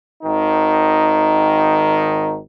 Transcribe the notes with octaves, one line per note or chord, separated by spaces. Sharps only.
G#1 D#3 D#4